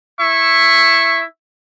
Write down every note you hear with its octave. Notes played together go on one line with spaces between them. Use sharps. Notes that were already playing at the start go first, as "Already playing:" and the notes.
E4 E5 C#6